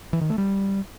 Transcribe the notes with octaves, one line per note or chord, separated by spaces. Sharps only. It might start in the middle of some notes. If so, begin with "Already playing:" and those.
E3
D#3
A3
G3